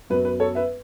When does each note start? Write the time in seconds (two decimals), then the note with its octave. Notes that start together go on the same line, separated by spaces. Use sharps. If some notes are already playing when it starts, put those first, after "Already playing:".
0.10 F#2 F#3 B3 B4
0.25 B4
0.40 A4 C#5
0.55 B4 E5